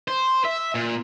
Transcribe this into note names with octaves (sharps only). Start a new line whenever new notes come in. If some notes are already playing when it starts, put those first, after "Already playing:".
C5
E5
A#2